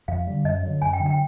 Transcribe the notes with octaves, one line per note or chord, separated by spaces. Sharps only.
F2 F5
D3 G3
F#2 D#5
D3 F#3
F#2 G#5
G5
D3 F#3
G5